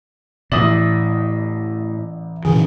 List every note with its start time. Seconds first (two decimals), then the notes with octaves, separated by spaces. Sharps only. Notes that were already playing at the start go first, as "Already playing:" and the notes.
0.52 A1 A2 D5 E5 D#6 F#7
2.45 A#2 C#3 E3 G#4